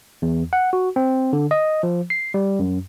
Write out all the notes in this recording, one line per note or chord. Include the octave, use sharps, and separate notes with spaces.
E2
F#5
F#4
C4
D3
D#5
F3
C7
G3
F#2